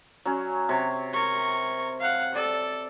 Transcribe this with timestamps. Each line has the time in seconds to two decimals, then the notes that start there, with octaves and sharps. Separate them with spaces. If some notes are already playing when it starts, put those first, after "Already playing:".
0.25 F#3 C#4
0.69 C3 C#5
1.13 A#4 C#6
2.00 F5 F#5
2.35 A4 D5